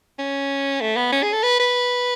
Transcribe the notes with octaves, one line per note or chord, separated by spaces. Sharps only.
C#4
A3
B3
C#4
G#4
A4
B4
B4